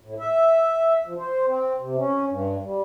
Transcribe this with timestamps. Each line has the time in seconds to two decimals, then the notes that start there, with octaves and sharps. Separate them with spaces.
0.01 A2
0.19 E5
1.06 F3
1.18 C5
1.47 C4
1.78 C3
1.97 C#4
2.29 G2
2.63 G3